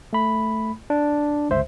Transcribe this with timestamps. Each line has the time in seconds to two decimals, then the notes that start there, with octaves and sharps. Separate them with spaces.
0.13 A3 B5
0.90 D4
1.49 G1 C#2 C5 E5